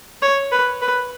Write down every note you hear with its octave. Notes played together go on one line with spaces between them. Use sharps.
C#5
B4
B4